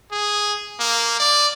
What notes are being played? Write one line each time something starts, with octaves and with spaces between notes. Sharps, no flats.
G#4
A#3
D5